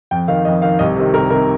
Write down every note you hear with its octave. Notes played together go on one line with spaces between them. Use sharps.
F2 G5
D#3 F5
F2 D#5
D#3 F5
C2 D#5
C3 D#3
C2 A#4
C3 D#3 A#4